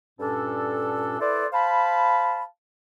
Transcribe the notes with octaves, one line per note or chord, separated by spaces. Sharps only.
G2 A#2 C#4 D4 A4
E4 A4 B4 C5 D5
C5 F5 A5 B5